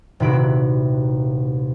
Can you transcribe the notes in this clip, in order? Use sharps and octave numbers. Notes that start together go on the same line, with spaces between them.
D#1 C3 E4 F#4 B5 D7